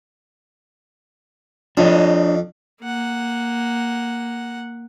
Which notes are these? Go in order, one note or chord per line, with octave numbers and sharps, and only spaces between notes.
F2 D4 C#5 D#5
A#3 F#5